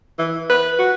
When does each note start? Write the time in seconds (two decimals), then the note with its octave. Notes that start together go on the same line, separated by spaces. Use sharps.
0.19 E3
0.50 B4
0.79 F#4